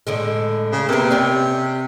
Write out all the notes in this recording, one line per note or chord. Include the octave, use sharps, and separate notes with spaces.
A2 D3 G#3
C#3
C3 A#3 B3
C#4 G4 D5